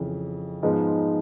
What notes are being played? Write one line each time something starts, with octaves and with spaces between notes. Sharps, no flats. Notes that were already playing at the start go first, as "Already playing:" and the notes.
Already playing: F2 C#3 E3
G#2 F3 G#3 B3 D#4